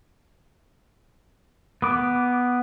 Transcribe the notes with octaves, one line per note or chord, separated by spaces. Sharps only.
B3 D6